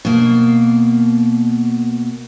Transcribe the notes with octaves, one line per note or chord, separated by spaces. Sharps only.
B2 A#3